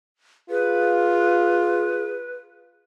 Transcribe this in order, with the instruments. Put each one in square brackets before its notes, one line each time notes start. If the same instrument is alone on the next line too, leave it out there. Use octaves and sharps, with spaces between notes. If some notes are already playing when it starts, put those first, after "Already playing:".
[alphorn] F4 [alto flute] G#4 [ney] B4